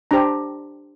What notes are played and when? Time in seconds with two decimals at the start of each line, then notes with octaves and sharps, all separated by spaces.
0.11 D4 G4 C5 A#5